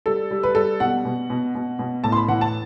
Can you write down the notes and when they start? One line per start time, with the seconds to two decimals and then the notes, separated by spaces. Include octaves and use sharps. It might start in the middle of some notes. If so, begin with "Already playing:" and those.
0.06 G3 A4
0.31 G3
0.43 B4
0.55 G3 A4
0.80 B2 F#5
1.05 B2
1.30 B2
1.55 B2
1.79 B2
2.04 A2 A5
2.12 C6
2.16 B5
2.28 E3 F#5
2.41 A5